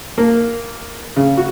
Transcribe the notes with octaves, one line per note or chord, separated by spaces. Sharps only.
A#3
C#3
F#4